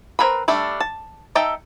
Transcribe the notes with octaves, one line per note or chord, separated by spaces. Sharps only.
C4 E4 A#4 B4 B5
G3 A3 D4 E5
A5
D#4 A4 E5 G5